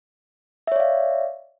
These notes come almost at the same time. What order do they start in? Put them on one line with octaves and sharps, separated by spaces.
E5 C#5 D5 F5